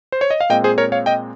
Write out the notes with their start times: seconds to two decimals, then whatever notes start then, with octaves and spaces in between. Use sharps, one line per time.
0.12 C5
0.21 C#5
0.31 D#5
0.41 F5
0.50 A#2 G#3 C4 D#5 G5
0.64 G#4 C5
0.78 A#4 C#5
0.92 C#5 F5
1.06 D#5 G5